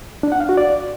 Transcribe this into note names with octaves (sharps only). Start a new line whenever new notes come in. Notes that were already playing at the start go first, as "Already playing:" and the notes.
D4
F#5
F5
F#4
D5